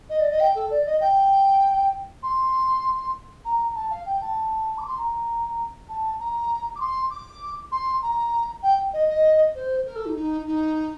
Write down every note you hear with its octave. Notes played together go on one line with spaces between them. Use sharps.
D#5
D5
D#5
G5
A4
D5
D#5
G5
C6
A#5
A5
F5
G5
A5
D6
C6
A#5
A5
A#5
D6
C6
D6
C6
A#5
G5
D#5
D#5
C5
A#4
A4
D#4
D#4
D#4